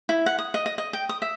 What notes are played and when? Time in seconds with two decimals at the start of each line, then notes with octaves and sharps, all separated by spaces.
0.09 E4
0.26 F#5
0.39 D#6
0.54 D#5
0.66 D#5
0.78 D#5
0.93 G5
1.09 D#6
1.22 E5